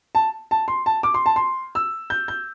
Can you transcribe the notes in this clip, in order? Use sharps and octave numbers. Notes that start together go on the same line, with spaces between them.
A5
A5
C6
A5
D6
C6
A5
C6
E6
G6
G6